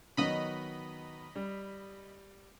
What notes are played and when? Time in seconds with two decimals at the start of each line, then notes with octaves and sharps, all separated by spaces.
0.17 D#3 F#3 B3 D#5 B5
1.35 G3